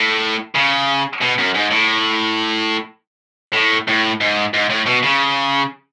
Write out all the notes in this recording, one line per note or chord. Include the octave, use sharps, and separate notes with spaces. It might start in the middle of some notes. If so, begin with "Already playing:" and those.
Already playing: A2
C#3
B2
F#2
G#2
A2
A2
A2
G#2
G#2
A2
B2
C#3